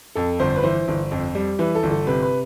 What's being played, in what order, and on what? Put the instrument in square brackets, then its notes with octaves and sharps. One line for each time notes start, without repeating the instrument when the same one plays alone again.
[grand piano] F2 A4
G1 C5
B4
E3 C5
G1
F2
G3
E3 B4
A4
G1
A4
C3 B4
B4